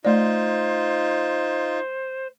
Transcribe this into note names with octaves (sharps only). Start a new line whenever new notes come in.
A3 D#4 F4 C5 D5